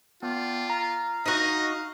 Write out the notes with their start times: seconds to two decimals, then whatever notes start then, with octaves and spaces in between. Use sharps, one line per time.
0.23 B3 F4 D5 G5 A5
0.70 F5 A#5
1.26 D#4 F#4 D#5